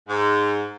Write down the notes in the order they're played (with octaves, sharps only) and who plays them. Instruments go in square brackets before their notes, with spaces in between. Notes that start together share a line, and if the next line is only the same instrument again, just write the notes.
[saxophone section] G#2